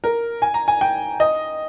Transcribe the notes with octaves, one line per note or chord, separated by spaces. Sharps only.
A#4
G#5
A#5
G#5
G5
D#5